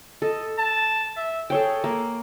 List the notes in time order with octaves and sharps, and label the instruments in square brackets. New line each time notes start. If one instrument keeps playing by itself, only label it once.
[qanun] A4 [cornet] D#5
[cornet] A5
E5
[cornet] G#4 [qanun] A4 C#5 G5
[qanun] A#3